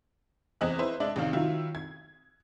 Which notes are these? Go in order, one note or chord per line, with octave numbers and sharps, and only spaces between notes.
E2 C4 G#4 D#5 F#6
E4 B4 C5
G#3 D4 D5 E5
A1 C3 D#3 F5
D#3 F#3 E4 F4
G#6